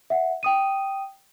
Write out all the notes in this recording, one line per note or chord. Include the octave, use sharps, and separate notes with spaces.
E5 F#5
G5 D#6 D#7